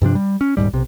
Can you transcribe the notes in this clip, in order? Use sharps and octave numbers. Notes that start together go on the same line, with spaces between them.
G2 C3 F3 D4
G3
C#4
D#1 A#1 G#2 G3
B1 C3